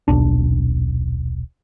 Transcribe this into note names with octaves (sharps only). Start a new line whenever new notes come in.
D#1 B1 D4